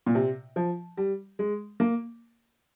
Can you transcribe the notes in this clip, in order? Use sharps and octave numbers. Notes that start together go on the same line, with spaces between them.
A#2
C3
F3
G3
G#3
A#3